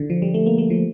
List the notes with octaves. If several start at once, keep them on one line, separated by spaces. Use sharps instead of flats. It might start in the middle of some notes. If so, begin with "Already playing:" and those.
Already playing: D3
F3
G3
A3
A#3
A3
F3